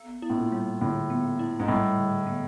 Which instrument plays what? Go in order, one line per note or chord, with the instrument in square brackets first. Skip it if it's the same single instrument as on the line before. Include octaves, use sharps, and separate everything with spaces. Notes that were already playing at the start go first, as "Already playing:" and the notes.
Already playing: [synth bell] B3
E4
[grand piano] A2
A#2
[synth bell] G3
[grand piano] A2 [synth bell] D3
[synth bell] B3
E4
[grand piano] G#2
[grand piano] A2 [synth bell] G3
[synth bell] D3
B3